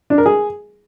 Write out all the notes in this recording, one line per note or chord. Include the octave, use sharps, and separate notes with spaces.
D4
A#4
G#4